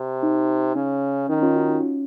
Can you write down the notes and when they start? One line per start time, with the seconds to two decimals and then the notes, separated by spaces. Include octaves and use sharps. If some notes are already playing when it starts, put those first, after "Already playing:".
Already playing: C3
0.23 D#4
0.75 C#3 C#4
1.29 D#3 D#4
1.42 C#4 F4
1.55 D#4 F#4
1.68 D#4
1.81 C#4